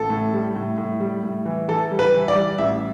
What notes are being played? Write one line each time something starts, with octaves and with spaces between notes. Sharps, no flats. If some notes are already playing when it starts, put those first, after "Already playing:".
Already playing: A1 A4
A2
G3
A2
A2
G3
A2
E3
E3 A4
G3
B4
E3
D5
G3
A1 E5